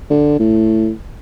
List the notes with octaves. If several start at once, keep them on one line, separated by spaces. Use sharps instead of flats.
D3
A2